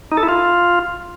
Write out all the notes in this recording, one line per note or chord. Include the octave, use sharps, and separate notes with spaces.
D#4
A4
E4
F4